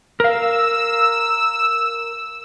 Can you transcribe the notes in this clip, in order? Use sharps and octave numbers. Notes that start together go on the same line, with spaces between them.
A#4 F5 E6